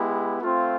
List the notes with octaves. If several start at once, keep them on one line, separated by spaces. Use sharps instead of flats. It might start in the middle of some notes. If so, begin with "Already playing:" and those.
Already playing: G#3 B3 E4 G4
A3 C4 F4